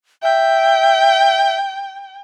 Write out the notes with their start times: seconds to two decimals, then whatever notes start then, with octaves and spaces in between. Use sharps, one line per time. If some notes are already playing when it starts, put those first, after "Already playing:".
0.23 E5 G5